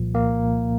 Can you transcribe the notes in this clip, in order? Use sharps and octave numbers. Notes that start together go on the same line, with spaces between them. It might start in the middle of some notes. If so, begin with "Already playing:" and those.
Already playing: C2 A#2 F3
A#3